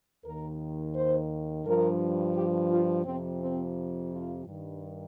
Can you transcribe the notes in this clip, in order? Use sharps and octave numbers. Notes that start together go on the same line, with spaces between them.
D#2 D#3 A#4
C5
G2 F3 A#4
G4
F4
F2 C3 F3 C4
C4
F4
G2 D#3